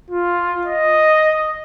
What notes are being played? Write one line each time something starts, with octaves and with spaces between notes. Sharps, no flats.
F4
D#5